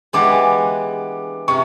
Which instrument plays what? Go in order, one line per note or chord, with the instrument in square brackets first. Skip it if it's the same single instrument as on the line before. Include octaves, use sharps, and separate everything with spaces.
[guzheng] E3 G#3 B3 D4 G4 [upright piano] D6
[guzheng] C3 [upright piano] C#6